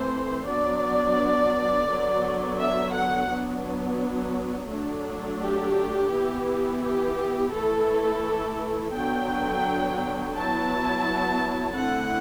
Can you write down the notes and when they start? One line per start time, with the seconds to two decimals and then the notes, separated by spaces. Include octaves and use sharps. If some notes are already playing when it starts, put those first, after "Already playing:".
Already playing: E3 A3 C4 C5
0.46 F#3 B3 D4 D5
1.88 D3 F#3 B3
2.58 E5
2.93 F#5
3.29 F#3 B3 D4
4.70 F#3 A3 D4
5.41 G4
6.12 E3 B3 E4
6.82 G4
7.52 E3 A3 E4 A4
8.93 D3 F#3 B3 G5
10.35 F#3 B3 E4 A5
11.76 D3 A3 C4 E4 F#5